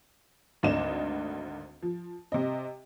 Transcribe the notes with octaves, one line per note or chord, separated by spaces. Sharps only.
G#1 D2 D3 D5 D#5 E7
F3
C3 D#5